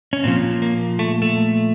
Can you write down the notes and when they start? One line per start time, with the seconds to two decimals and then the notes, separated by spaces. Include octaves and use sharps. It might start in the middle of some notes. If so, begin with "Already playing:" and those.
0.13 C#4
0.24 A#2 F3 C4
0.62 A#3
0.99 A3
1.22 A3